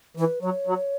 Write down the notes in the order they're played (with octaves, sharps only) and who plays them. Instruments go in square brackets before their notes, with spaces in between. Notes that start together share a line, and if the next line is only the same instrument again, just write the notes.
[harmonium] E3 [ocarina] B4
[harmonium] F#3 [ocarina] C#5
[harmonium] F#3